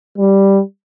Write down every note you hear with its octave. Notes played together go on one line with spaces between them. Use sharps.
G3